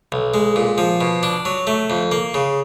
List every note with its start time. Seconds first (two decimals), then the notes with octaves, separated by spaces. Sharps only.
0.12 B1
0.34 G#3
0.56 A#2
0.78 F3
1.01 B2
1.23 D4
1.45 F#3
1.67 A3
1.90 F2
2.12 A#3
2.34 C#3